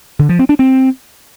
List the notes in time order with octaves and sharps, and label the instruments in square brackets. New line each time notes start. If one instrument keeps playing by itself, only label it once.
[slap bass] D3
F3
C4
D4
C4